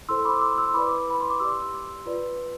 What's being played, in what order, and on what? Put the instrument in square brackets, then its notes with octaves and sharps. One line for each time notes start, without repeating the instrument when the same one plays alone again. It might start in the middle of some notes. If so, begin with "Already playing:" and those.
[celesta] E4 A4 C5 C6 E6
B5 D6
C6 E6
C6 E6
E4 B4 D5 B5 D6
B5
C6
D6
G4 D5 C6 E6
F4 B4 D5